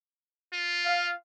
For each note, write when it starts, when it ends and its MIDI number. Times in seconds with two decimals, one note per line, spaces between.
0.53 1.12 65
0.86 1.13 77